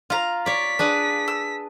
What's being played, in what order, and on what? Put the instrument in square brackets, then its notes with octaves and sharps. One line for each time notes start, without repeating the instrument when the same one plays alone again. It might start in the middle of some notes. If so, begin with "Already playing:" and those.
[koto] F4 [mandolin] F5 A#5
[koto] C#5 D5 [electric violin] B6
[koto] D4 G#4 B4
[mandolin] E6